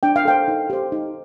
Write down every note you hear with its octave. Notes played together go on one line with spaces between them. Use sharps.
D4 G5
F5
A4 C5 G5
D#4
G4 C5
D#4